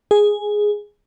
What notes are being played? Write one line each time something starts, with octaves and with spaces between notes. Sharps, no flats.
G#4